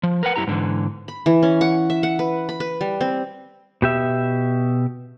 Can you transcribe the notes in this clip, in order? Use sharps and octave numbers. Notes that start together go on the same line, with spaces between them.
F3
A#4 B4 F#5
F#2 E3 E4 G4 A#5
G#2 D3 E3
B5
E3
C#4
F#5
E5
F#5
B4
B5
B4
G3
C4
B2 G4 E5